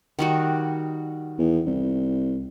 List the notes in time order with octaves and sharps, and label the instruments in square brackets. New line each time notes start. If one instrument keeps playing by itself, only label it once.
[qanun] D#3 G3 F#4
[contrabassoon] E2
C2